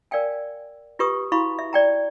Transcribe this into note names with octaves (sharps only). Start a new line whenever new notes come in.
A#4 D5 F5 G5 G#5
F4 G4 B4 C#6 D#6
E4 F#4 F5 B5 C#6
E5
D5 G5 A#5